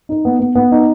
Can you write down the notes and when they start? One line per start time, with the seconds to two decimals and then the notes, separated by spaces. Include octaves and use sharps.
0.09 D#4
0.25 B3
0.39 B3
0.55 B3
0.72 D#4